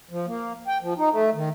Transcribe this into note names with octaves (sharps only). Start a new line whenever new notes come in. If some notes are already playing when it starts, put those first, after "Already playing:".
F3
A#3
G5
F3
D#4
A3
D#3